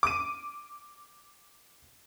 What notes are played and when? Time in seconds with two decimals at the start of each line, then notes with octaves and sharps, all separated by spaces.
0.03 D6 D#7